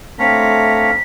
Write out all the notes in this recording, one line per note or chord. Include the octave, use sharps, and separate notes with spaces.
A3 C4 D4 C#5 F5 A#5 B6